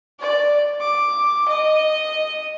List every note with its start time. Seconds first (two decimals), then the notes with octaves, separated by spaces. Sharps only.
0.19 D5
0.80 D6
1.48 D#5